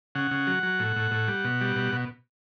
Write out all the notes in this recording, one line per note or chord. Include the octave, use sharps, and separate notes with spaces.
C#3 F#5
C#3
F#3
F#3
A2
A2
A2
G3
B2
G3
B2
B2